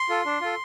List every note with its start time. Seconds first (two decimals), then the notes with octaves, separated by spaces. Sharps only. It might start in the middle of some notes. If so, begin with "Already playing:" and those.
Already playing: C6
0.09 F4 A4
0.25 D4
0.41 F4 A4